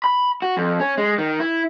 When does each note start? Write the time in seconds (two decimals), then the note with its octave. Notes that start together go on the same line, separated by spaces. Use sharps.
0.04 B5
0.42 F#4
0.57 F2
0.80 C#4
0.98 G#3
1.18 D#3
1.40 E4